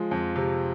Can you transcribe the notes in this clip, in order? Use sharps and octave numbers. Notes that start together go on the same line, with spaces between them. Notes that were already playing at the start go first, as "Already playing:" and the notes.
Already playing: F3 G#3
F2
C3